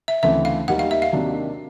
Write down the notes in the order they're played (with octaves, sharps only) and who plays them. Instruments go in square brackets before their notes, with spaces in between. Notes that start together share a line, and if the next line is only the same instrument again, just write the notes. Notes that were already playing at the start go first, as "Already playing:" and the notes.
[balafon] E5
[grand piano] D2 C#3 E3 A3 C4 [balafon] E5
[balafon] F5
[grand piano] D#2 D#3 G3 [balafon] F#5
[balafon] F5
E5
F5
[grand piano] C3 D#3 F#3 A#3 D4